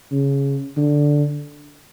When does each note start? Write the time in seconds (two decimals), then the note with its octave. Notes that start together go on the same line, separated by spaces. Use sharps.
0.11 C#3
0.77 D3